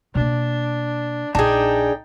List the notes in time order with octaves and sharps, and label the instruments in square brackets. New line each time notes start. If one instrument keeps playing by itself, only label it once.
[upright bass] B2 A#3 [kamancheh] D4
[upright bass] A#1 [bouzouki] D4 G#4 [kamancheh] D#4 G5